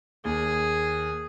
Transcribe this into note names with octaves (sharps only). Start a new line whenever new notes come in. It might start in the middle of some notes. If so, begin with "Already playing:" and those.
D#2 G#4